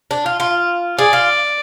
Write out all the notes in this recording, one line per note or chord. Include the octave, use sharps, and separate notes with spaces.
D4
F4
F4
G#4 D5
F4